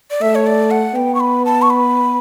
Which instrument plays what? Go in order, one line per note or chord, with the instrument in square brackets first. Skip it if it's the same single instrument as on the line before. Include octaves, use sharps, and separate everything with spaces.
[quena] D5
[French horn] A3 [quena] E5
[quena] C#5
D5
F#5
[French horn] B3 [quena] G5
[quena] C#6
B5
A5
C#6
B5